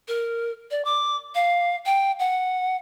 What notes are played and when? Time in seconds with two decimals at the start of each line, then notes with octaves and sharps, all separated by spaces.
0.08 A#4
0.71 D5
0.85 D6
1.35 F5
1.86 G5
2.19 F#5